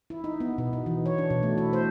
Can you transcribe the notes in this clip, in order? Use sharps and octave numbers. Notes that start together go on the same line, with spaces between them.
E4
D#4
B3
B2
D#4
E3
C#5
D4
B2
A3
E4
C5